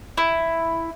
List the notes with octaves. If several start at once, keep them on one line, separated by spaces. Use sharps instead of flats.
E4